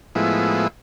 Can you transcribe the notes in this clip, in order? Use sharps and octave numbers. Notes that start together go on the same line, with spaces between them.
A2 F3 G#3 B3 E4